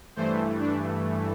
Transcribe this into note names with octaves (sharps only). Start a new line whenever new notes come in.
G2 E3 A3 C5
D4